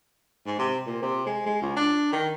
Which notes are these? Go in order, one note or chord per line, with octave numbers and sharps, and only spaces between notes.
G#2
C3
A#2
C3
G#3
G#3
C#2
D4
D#3